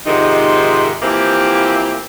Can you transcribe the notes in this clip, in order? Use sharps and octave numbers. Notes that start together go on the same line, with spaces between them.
F2 G#2 C3 D#3 D#4
E3 F3 A#3 C4 E4 G4